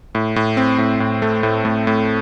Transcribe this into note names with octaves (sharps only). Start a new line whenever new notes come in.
A2
A2
C4
A2
A2
A3
A2
A2
A2